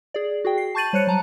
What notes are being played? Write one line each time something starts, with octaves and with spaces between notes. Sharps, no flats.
G#4 D5
F#4 G#4 G5
C7
A5 C#6 G6 A6 D#7 F#7
G3 C5 C#5 F#6 C#7 D#7
F#3 A5 A#5